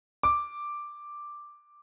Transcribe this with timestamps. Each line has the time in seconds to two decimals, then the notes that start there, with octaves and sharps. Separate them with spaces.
0.23 D6